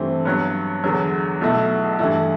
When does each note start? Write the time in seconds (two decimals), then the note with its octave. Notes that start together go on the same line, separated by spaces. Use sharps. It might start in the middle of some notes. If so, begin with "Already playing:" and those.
Already playing: G2 E3 A3 C4
0.25 G2 F#3 B3
0.84 E2 D3 F#3 B3
1.41 B1 B2 A3 E4
1.99 G2 E3 A3 E4